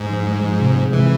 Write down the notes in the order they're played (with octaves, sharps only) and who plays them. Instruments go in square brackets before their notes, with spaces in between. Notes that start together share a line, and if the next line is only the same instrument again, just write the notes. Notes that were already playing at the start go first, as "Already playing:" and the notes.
Already playing: [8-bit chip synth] G#2
[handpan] F3
G#3
F3
C3
G#3
[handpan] C3 [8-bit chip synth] E3